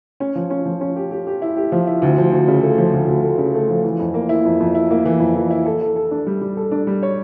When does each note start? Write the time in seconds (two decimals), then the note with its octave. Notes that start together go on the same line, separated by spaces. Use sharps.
0.20 C#4
0.35 F3
0.50 C#4
0.65 F3
0.81 C#4
0.96 G4
1.11 G4
1.27 G4
1.42 E4
1.57 G4
1.72 F3
1.87 E4
2.02 D2
2.18 F3
2.32 D2
2.48 C#3
2.63 A3
2.78 F3
2.94 D2
3.08 D2
3.23 A3
3.38 C#3
3.54 A3
3.69 F3
3.84 E3
3.99 F2
4.14 A#3
4.29 E4
4.45 F2
4.60 F2
4.75 E4
4.91 A#3
5.05 E3
5.20 F2
5.35 E3
5.51 E4
5.66 A4
5.81 A4
5.96 A4
6.11 D4
6.27 G3
6.41 G3
6.57 A4
6.72 D4
6.87 G3
7.03 C#5